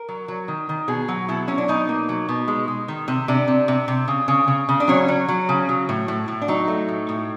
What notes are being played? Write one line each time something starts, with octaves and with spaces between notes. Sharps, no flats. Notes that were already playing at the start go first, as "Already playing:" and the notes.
Already playing: A#4
F#3
F#3
D#3
D#3
B2 G#4
F#3
B2 E4
F#3 C#4
D4
B2 D#4
A#3
F#3
B2
G#3
G#3
D#3
C3
C3 D4
C3
C3
C3
C#3
C#3
C#3
C#3
D4
F#3 C#4
F#3
F#3
C#3
F#3
A2
A2
A2
D4
F#3 D#4
A3
A2
A2